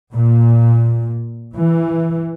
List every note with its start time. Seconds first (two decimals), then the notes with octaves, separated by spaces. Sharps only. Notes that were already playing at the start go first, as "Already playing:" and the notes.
0.13 A#2
1.54 E3